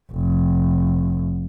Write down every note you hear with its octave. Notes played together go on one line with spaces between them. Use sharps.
F1